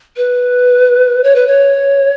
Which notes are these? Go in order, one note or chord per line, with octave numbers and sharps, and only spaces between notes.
B4
C#5
B4
C#5